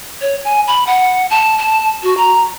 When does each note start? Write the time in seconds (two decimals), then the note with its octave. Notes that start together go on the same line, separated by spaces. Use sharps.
0.21 C#5
0.45 G#5
0.67 B5
0.87 F#5
1.30 A5
1.58 A5
2.03 F#4
2.17 A#5